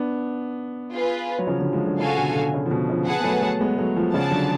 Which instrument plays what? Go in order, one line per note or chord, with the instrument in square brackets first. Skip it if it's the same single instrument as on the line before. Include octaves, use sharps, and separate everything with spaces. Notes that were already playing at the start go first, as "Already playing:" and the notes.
Already playing: [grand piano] B3 D4
[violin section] F4 G#4 B4
[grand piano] F#3
C#3 F3
D3 F#3
F3 G#3
D3 F#3
[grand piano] C#3 F3 [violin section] F#4 A4 F5 G#5
[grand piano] B2 D3
B2 D3
C#3
F3
B2 D3
C#3 F3
[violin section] G#4 B4 F#5 A5
[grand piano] B3
F#3 A3
F#3 A3
G#3 B3
F#3 A3
F3 G#3
[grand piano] C#3 F3 [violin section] G#4 D5 F#5 A5
[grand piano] D3 F#3